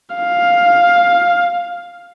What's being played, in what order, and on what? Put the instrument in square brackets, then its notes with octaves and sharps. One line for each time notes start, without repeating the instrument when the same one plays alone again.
[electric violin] F5